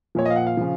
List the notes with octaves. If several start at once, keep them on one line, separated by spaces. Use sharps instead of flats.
A#2 F3 C#5
D#5
F5
F#5
F5
C#3 F3